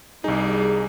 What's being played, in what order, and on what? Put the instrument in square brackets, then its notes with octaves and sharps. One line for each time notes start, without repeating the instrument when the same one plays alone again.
[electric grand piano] C2 D#4 [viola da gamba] G3 [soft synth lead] G#4